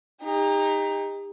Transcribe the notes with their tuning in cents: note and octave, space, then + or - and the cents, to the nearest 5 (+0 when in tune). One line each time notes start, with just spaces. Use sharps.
D#4 +0 G4 +40